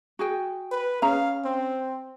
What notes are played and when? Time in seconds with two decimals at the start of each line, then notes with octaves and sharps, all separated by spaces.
0.19 F#4 G#4 G5
0.71 B4
1.02 C#4 G#4 F5 A#5
1.45 C4